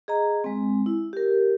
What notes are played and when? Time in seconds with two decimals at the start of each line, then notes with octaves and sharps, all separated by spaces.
0.08 G#4 D#5 A#5
0.44 G#3 C4
0.86 E4
1.13 G4 A#4